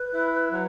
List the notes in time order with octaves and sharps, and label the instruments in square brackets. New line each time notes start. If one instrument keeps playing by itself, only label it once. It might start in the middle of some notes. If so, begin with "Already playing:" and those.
Already playing: [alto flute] B4
[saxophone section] E4
F#3